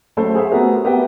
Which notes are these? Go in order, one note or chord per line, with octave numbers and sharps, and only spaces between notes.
F#3 A3 C#4 F#4 A4 C5
G#4 C5 E5
A3 B3 C4 F#4 G4 A#4
B3 G4 A#4 E5 F#5 G5